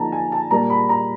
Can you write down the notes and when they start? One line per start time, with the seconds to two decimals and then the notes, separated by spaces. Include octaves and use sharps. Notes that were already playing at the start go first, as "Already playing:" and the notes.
Already playing: D3 F3 A#3 D#4 A5 A#5
0.12 G#5
0.32 A5
0.51 A#2 G3 A#3 D4 A#5
0.70 B5
0.89 A#5